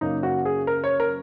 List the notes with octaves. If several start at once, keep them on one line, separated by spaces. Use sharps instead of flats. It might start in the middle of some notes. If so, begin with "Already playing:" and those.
F#2 C#3 A#3 D#4
F#4
G#4
A#4
C#5
A#4